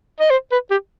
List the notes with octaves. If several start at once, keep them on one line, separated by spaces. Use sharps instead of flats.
D#5
C5
B4
G4